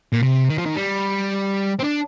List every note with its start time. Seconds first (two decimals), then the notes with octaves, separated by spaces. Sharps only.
0.13 A#2
0.23 C3
0.49 D#3
0.58 F3
0.66 D#3
0.76 G3
1.79 C4
1.84 D4